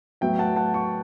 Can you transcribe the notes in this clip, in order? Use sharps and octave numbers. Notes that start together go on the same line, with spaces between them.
A2 F#3 B3 E5 G5
F#5 A5
F#5 A5
A5 C#6